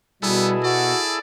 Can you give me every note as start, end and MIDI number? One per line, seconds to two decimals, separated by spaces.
0.23 0.93 47
0.23 0.56 55
0.23 0.52 59
0.23 1.19 64
0.23 1.19 68
0.23 1.19 69
0.64 1.00 66
0.64 1.20 74